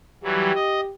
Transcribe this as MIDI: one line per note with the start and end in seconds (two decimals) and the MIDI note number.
0.23 0.52 52
0.23 0.52 54
0.23 0.52 55
0.23 0.93 67
0.55 0.80 75